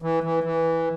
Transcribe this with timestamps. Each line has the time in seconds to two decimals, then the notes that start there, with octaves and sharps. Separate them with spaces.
0.02 E3
0.23 E3
0.44 E3